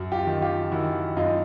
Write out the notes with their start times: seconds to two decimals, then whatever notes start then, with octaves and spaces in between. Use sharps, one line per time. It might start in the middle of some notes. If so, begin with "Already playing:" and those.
Already playing: F#2
0.12 F4 G4
0.27 D#3
0.42 F4 G4
0.72 D#3 E4 F#4
1.17 F#2 D#4 F4